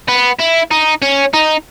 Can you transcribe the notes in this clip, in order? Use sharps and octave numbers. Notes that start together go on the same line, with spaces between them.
B3
E4
D#4
C#4
D#4